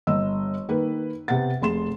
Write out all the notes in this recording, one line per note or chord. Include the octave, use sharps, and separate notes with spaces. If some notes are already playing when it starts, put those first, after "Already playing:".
G1 D#5 E6
D#3 A#3 B4
C3 B3 F#5 A6
F1 G#4 C6 E7